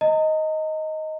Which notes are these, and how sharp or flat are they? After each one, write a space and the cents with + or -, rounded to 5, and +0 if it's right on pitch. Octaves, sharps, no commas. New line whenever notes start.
D#5 +10 A#5 -40